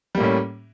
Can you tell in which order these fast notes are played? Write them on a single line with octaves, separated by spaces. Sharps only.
G3 A#3 A2 C#4